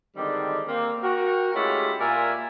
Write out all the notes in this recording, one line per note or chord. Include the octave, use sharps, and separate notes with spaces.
D3 D#3 G3 G#3 C4 D5
A#3 C4
F#4 A#4 G5
G#3 A3 C#4 E4 F4 G4
A#2 F4 A#4 D5 E5 G#5